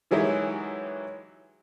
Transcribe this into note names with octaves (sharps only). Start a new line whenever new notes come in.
D#3 E3 F#3 G#3 E4 G4